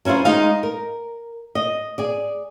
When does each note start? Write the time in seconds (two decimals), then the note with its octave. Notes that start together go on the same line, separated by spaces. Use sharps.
0.05 F#3 C#4 E4 F4 C5
0.25 G#3 D#4 F5
0.63 A#4
1.55 D#5
1.98 G#4 D5